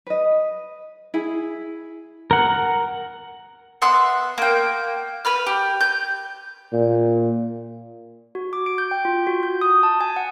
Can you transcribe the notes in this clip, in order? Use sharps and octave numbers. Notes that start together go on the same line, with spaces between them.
B4 D#5
E4 G#4
A#4 F#5
B3 E5 C6 F#6
A#3 G5
B4 B5 F6
G4
G6
A#2
F#4
D6
D7
G6
G5
F4
F#4
G6
D#6
A5
G#5
F#5